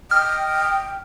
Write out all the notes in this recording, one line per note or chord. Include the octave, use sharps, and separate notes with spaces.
D#5 G5 F6